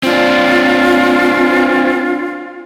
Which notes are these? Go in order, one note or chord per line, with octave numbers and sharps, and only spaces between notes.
C4 D4 F4